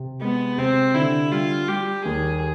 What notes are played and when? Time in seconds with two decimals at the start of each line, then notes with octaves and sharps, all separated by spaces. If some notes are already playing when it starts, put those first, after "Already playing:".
Already playing: C3
0.21 G#3 B3
0.58 C3 C4
0.94 D3 E4
1.31 G3 F4
1.68 G3 G4
2.05 D#2 G#4